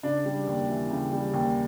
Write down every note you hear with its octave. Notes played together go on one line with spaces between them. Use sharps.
C#3 D4
G3
D#2
E3
C#3
G3
D#2